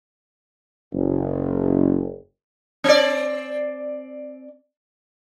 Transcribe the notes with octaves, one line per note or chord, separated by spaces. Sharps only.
F#1
C4 D5